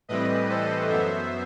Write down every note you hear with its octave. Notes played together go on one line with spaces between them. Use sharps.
A2 E3 G3 C4 B4 D#5
A4 C5
F#2 F#3 B3 C5 E5